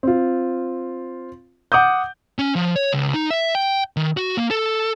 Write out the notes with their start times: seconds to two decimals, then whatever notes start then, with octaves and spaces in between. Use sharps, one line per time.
0.03 C4 F4
1.72 F#5 D6 D#6 G6
2.39 C#4
2.55 F3
2.76 C#5
2.93 C#2
3.14 D#4
3.30 E5
3.55 G5
3.97 D#3
4.17 F#4
4.37 A#3
4.51 A4